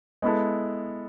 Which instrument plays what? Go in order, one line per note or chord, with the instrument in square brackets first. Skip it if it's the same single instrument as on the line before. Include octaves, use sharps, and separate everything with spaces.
[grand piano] G#3 B3 E4 A4